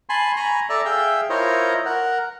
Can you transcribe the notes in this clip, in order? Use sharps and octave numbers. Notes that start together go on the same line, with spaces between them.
G#5 A5 B5 C6
G#5 A#5 B5 C#6
A4 D5 E5 A5 A#5
G#4 E5 F5 G5 E6
E4 F4 A#4 C5 C#5 D#5
A#4 F#5